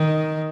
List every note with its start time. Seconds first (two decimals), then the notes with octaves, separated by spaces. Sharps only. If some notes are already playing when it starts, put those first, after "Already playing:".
Already playing: D#3